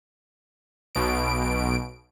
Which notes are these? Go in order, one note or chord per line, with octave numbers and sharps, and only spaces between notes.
B1 B2 D7